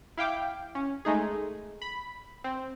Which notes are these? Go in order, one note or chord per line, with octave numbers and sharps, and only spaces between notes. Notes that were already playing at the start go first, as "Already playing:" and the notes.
E4 F5 G5 D6
C#4
G#3 A3 D#4 G#4
B5
C4